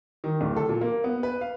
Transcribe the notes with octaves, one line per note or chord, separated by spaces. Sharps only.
D#3
D1
A4
A#2
A#3
B3
B4
F5